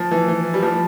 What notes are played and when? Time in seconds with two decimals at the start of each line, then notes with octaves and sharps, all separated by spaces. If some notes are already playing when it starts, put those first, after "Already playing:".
Already playing: F3
0.11 E3
0.28 E3
0.54 G3
0.63 F3